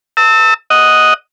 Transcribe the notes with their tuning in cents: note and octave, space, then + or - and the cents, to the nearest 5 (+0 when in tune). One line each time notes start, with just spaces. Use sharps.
A5 +40 E6 -25
D#5 +0 F#5 +0